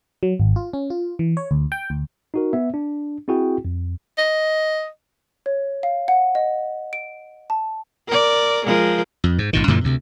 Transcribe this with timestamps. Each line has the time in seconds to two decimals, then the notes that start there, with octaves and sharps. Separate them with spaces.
0.23 F#3
0.40 G#1
0.56 F4
0.73 C#4
0.90 F4
1.19 E3
1.37 C#5
1.51 D2
1.72 G5
1.90 D2
2.34 D#4 F#4 A#4
2.53 B3 E5
2.74 D4
3.28 C4 E4 F#4 G#4 G5
3.65 F2
4.18 D#5
5.46 C#5
5.83 F5
6.08 F#5
6.35 D#5
6.93 D7
7.50 A5
8.08 A#4 D5
8.65 F3 G#3 A#4
9.24 F2
9.38 G#2
9.53 G#1 A#2 D#3
9.68 F#2 A#2 D3 E3
9.84 D2 C3